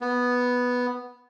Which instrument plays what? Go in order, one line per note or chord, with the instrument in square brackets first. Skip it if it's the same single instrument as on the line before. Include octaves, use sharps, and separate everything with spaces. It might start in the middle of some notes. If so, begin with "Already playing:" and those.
[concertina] B3